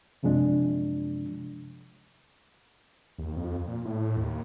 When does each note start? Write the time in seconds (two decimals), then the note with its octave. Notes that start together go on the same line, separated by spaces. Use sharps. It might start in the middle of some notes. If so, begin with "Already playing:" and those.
0.23 F#2 C3 F3 G#3 D4
3.18 D#2
3.36 F2
3.68 A#2
3.85 A2
4.17 D#2